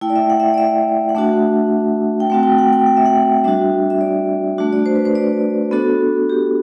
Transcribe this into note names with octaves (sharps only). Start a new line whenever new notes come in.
A3 E4 G5
D5
E5
F#5
E5
F#5
D5
E5
F#5
A3 D4 F#4 E5
G5
A3 C4 F#4 F#5
G5
F#5
G5
F#5
E5
F#5
G3 D4 F#4 E5
E5
D5
A3 D4 F#4
D5
C5
B4
C5
D5
B3 D4 F#4 A4
G4